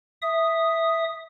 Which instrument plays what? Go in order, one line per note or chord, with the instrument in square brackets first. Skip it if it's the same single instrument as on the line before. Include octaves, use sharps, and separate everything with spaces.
[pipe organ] E5 D#6